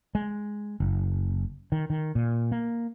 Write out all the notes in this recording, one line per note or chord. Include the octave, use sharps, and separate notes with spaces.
G#3
F#1
D#3
D#3
A#2
A#3